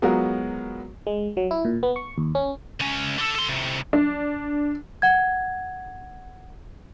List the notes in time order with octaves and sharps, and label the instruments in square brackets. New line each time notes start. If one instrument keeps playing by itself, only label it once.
[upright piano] F#3 G#3 B3 F4 F#4 A#4
[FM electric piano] G#3
F#3
E4
A#2
B3
C#6
D#2
C#4
[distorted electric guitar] C#2 C#4
D3 A4
A4 C6
A2 C3
[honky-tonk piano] D4
[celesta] F#5 G#6